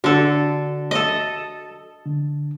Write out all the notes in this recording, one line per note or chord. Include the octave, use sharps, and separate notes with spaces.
D3 F#4 A4
A4 D#5
D3